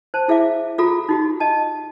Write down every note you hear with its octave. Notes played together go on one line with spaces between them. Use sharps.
C5 A5
E4 G#4 E5 F5 D6
F4 F#4 G#4 A4 A#5
D#4 F#4 G4
D#5 A5